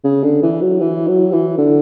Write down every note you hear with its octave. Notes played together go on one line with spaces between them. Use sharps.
C#3
D3
E3
F#3
E3
F#3
E3
D3